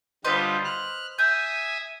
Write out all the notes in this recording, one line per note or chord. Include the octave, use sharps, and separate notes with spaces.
D3 G3 F4 B4 C5 D#5
F6 F#6
E5 G#5 D#6 G6